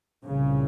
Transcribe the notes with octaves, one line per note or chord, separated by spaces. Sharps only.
C2 A#2 C#3